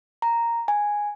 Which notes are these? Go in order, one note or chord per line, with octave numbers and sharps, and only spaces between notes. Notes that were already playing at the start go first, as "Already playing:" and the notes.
A#5
G#5